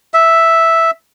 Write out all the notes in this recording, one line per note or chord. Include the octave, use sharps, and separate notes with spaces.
E5